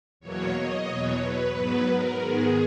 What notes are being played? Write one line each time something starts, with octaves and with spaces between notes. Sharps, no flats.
E2 B2 F#3 A#3 C#5
D#5
E2 B2 F#3 C#5
B4
G#2 F#3 B3 B4
A#4
G#2 D#3 G#3 B3 G#4